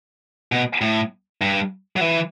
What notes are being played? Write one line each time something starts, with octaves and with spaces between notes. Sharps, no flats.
B2
A2
G2
F#3
E3